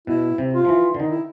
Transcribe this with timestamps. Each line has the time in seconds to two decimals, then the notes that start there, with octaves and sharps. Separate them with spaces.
0.07 B2 E4
0.38 C3
0.54 F4
0.65 F3
0.69 E3
0.94 D3
1.00 D#3 D#4
1.11 E4